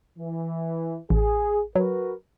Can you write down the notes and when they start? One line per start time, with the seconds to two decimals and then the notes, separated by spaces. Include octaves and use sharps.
0.19 E3
1.10 A1 G#4
1.75 F#3 F#4 A#4 B4